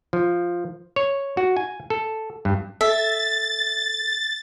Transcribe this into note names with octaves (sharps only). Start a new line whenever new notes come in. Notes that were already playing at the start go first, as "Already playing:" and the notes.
F3
C#5
F#4
G#5
A4
G2
A4 E5 A6